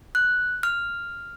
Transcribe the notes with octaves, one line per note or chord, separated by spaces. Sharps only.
F#6
F6